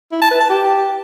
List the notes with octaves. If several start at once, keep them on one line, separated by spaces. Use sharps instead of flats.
E4
A5
B4
A5
G4